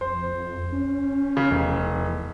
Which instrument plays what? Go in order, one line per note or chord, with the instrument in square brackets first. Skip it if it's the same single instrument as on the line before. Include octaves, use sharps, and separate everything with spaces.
[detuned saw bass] F2 [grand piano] C5
[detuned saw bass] C#4
[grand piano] C#3
[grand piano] F1 [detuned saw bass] E2